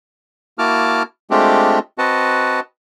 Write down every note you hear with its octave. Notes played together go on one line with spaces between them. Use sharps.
A#3 E4 F#4 A5 D6 F6
G#3 A3 C4 D4 F4 G4
C4 F#4 B4 D#5 F#5 A5